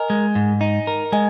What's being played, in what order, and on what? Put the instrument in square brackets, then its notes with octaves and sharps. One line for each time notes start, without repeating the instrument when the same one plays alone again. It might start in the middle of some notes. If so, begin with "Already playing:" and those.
Already playing: [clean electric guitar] A#4 [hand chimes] D#5 G#5
[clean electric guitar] G#3
G#2
D#4
A#4
[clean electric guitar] G#3 [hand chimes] D#5 G#5